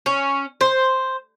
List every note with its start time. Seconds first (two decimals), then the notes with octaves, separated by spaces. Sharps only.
0.06 C#4
0.61 C5